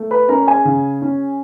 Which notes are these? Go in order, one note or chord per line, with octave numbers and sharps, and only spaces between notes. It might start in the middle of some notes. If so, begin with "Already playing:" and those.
Already playing: A3
B4 B5
C#4 A#4 A#5
G#4 G#5
C#3
C#4